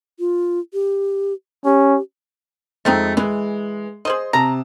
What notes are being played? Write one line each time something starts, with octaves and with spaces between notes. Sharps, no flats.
F4
G4
C#4 G4
F2 G#3 A3 C4 D#4
E3 G#3
G#4 C5 D#5 C6 D#6
C3 A5 A#5